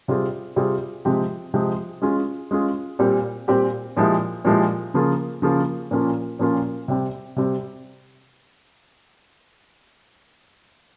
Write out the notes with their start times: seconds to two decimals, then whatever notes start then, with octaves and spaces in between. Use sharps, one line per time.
0.08 C3 G3 C4 F4 G#4
0.56 C3 G3 C4 F4 G#4
1.05 C3 F3 G#3 C4 G4
1.54 C3 F3 G#3 C4 G4
2.02 G#3 C#4 F4 G#4
2.51 G#3 C#4 F4 G#4
2.99 A#2 G3 C4 G4
3.48 A#2 G3 C4 G4
3.97 A#2 F3 G#3 E4 G4
4.45 A#2 F3 G#3 E4 G4
4.94 C#3 F3 A#3 F4 G#4
5.42 C#3 F3 A#3 F4 G#4
5.91 A#2 F3 A#3 C#4 F4
6.39 A#2 F3 A#3 C#4 F4
6.88 C3 G3 C4
7.36 C3 G3 C4